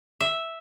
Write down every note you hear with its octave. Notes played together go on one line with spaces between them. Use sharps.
E5